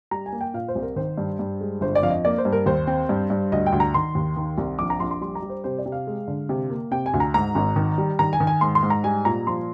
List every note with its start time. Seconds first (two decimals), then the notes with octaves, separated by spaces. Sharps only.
0.11 G3 A#5
0.26 G#5
0.32 A#3
0.41 G5
0.54 A#2 F5
0.68 C5
0.75 C2
0.82 A#4
0.96 D#3 C5
1.18 G2
1.39 G2
1.61 G#3
1.81 G1 C5
1.95 D5
2.03 F2 F5
2.10 D#5
2.25 A#3 D5
2.38 C5
2.45 G2
2.53 A#4
2.66 D#2 C5
2.87 C4
3.09 G2
3.30 G2
3.52 D2 D#5
3.66 G5
3.72 D2
3.80 A#5
3.94 D#3 C6
4.15 D#2
4.37 D#3
4.58 C2
4.79 A#1 D6
4.90 A#5
5.00 A#1 C6
5.11 C6
5.21 G3 C6
5.35 A#5
5.42 G3
5.49 C5
5.64 C3 C5
5.78 D5
5.86 C3
5.92 F5
6.07 G#3
6.28 D3
6.49 C3
6.70 A#3
6.91 C3 G5
7.06 G#5
7.14 D2
7.20 A#5
7.34 G#2 A#5
7.55 G#1
7.76 D#3
7.98 G3
8.19 D#3 A#5
8.33 G#5
8.40 D#3
8.47 G#5
8.61 G#2 C6
8.75 C6
8.83 G#2
8.90 A#5
9.04 G3 G#5
9.25 A#2 A#5
9.47 F3 C6